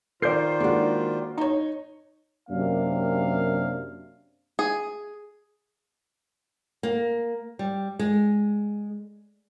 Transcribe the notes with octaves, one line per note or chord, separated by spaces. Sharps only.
D#3 F4 A#4 C5 D5 G6 C7
G#3 A#3 D4 F#4
D#4 C#5
F#2 C3 A#3 D4 F5
G#4
A#3
G3
G#3